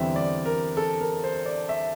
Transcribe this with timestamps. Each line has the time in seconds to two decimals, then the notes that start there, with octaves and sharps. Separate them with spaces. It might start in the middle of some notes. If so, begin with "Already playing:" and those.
Already playing: E2 D3 G3 C4 E5
0.16 D5
0.46 A#4
0.77 A4
1.01 A#4
1.24 C5
1.46 D5
1.69 E5